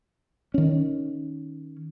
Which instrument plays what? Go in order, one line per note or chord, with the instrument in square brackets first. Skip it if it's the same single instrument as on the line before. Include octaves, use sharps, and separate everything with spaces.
[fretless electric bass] D#3 C#4